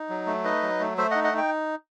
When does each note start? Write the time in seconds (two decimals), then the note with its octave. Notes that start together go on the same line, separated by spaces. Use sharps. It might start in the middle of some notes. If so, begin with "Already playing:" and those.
Already playing: D#4
0.09 F#3
0.27 A3
0.44 D#4 B4 D#5
0.62 F#3
0.80 A3
0.98 A3 C5 E5
1.11 D#4 D#5 F#5
1.24 D#5 F#5
1.33 D#4 G5